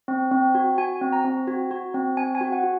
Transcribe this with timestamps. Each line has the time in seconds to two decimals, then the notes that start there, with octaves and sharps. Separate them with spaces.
0.08 C4
0.31 C4
0.55 F#4
0.78 F#4 G#5
1.01 C4
1.13 A#5
1.25 C4
1.47 F#4
1.71 F#4
1.94 C4
2.17 C4 G#5
2.35 G#5
2.41 F#4
2.52 F#5
2.64 F#4